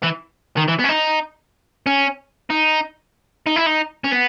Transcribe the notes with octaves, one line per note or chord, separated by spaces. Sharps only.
E3
D#3
E3
B3
C#4
D#4
C#4
D#4
D#4
E4
D#4
C#4
B3